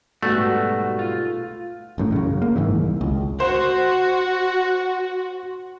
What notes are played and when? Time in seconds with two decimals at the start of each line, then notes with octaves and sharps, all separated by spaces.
0.23 G#2 B2 G3 A3 F#4 F#5
0.99 F4
1.98 A1 F#2 A2
2.12 F#2 C#3
2.42 A#3
2.56 F#1 G#2 D#3 E3
2.74 C2
3.01 C#2
3.40 F#4 C5